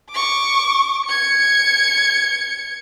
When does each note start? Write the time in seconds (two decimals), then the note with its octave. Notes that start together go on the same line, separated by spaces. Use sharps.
0.10 C#6 D6
1.06 G#6 C#7